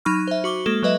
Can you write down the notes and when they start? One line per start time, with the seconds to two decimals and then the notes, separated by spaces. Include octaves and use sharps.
0.05 F#3 D#4 B5 C#6 F6
0.27 C5 E5
0.44 F#4 C#6 D6 G7
0.66 G#3 A#3 A4 E7 G7
0.83 F#3 A4 B4 D#5 E5